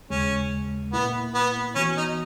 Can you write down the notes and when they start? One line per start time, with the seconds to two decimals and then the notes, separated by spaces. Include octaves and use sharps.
0.10 D#2 C#3 G#3 C#4
0.93 A#2 A#3 B3 E4
1.35 B3
1.76 E3 B3 C#4 F#4
1.97 D#4